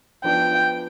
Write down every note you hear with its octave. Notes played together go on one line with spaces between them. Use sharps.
F3 B3 D4 G5